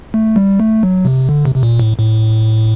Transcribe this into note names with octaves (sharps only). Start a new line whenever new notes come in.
A3
G3
A3
F#3
C3
D3
C3
C3
A#2
A2
A2